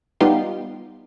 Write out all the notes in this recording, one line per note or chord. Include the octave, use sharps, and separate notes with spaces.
G3 B3 D#4 F4 G4 C6